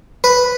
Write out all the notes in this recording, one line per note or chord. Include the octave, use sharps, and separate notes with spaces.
B4